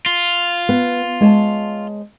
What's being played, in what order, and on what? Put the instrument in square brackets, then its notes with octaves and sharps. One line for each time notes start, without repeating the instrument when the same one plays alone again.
[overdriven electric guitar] F4
[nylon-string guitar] B3
G#3 C#5 A5